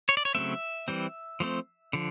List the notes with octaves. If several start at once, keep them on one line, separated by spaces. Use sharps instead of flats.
C#5
D5
C#5
C#3 F#3 A3 C4 E5
E3 G3 C4
F3 A3 C4
D3 F3